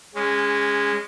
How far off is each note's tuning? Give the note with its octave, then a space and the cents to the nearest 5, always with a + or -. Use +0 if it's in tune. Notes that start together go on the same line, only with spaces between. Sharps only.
G#3 -15 C#4 +0